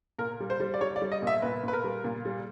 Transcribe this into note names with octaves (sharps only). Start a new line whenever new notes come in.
A#2 A#4
G3
C5
G3
D5
G3 C#5
D5
G3
D#5
A#2 E5
A#2 B4
A#2 B4
A#4
G3
A#2
G3